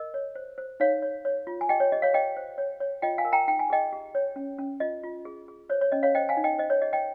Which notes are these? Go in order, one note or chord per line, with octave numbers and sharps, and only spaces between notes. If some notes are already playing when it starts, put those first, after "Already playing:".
Already playing: A#4 D#5
C#5
C5
C5
D#4 C#5 F5
C#5
C#5
F4
G#5
G4 D#5 G5
C#5
G4 D#5
C#5 F5
G4 D#5 G5
C5
C#5
C#5
F4 D#5 G5
F5 G#5
A#4
G5 A#5
D#4 G5
G#5
G#4 D#5 G5
G4
C#5
C#4
C#4
F4 D#5
F4
G#4
G#4
C5 C#5
C#5
C#4 D#5
C#5 F5
C5 D#5 G5
F5 G#5
D#4
D#5 G5
C5 D#5
C#5
G4 D#5
D#5 G5